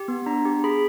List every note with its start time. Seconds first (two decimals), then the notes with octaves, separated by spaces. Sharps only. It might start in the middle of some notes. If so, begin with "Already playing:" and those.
Already playing: G4
0.08 B3
0.26 D4 A#5
0.45 G4
0.64 G#4 B5